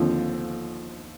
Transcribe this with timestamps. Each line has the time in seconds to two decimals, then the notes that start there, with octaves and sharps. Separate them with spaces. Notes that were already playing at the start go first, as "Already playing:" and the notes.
Already playing: D#2 D3 F3 C4